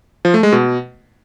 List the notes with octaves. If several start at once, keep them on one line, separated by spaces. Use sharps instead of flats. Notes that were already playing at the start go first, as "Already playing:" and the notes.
F3
A3
G#3
B2